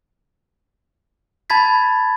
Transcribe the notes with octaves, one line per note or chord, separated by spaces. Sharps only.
A5 B5 G#6 A6 B6